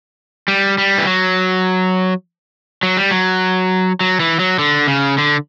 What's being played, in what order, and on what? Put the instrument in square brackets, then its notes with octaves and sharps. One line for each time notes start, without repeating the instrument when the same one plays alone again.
[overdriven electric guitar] G3
G3
E3
F#3
F#3
G3
F#3
F#3
E3
F#3
D3
C#3
D3